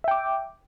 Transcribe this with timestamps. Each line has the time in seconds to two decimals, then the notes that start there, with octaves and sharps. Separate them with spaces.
0.04 E5
0.08 G5
0.11 D6